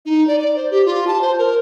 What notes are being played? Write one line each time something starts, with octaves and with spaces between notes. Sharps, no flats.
D#4
D5
D5
C5
G4
F4
A5
C5
A#4